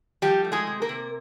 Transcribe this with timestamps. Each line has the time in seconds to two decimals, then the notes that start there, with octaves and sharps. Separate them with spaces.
0.22 F3 G3 G4
0.44 A3
0.52 G#3 G#4
0.67 C3
0.82 A#3 A#4
0.89 C3